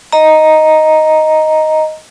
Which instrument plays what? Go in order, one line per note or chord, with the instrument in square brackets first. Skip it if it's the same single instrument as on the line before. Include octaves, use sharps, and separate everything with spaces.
[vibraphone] D#5 A#5